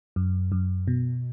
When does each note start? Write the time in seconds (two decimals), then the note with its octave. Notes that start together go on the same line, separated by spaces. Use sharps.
0.16 F#2
0.52 F#2
0.88 B2